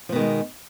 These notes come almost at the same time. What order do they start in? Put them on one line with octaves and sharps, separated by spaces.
F3 B2 D#3 G#3